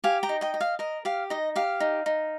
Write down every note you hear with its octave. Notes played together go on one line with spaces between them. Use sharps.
G4 F5 G#5
G5 A#5
D#4
D#5 G5
D#5
F5
A#4 D#5
G4 F5
D#4 D#5
G4 F5
D#4
D#4